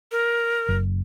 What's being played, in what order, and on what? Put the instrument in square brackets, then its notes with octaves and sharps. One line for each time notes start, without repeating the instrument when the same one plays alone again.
[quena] A#4
[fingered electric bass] F#1